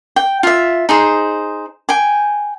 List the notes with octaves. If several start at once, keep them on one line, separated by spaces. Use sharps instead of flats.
G5
F4 E5
D#4 G#4 C5
G5 G#5